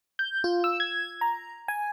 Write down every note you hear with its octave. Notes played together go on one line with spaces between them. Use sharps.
G6
F4
E6
G#6
A#5
G#5